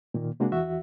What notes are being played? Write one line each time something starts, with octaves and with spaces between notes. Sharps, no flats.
A#2 D#3 A#3
C3 G#3 A#3 D4 F#4 G#4
E2 E3 F#4 E5